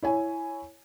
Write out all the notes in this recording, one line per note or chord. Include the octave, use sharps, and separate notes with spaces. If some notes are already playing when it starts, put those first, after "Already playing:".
E4 C#5 G#5